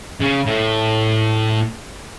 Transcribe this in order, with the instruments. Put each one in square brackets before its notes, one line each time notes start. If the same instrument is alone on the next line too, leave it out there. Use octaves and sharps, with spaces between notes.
[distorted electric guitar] C#3
A2